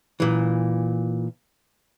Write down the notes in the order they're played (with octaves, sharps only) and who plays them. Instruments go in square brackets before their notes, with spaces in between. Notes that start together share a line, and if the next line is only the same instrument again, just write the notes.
[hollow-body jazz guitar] A#2 E3